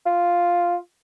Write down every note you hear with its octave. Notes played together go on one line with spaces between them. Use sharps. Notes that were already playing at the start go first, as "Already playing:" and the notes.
F4